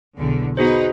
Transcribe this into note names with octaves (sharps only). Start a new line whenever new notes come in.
B1 E2 D3
B3 D#4 F#4 G#4 B4 C5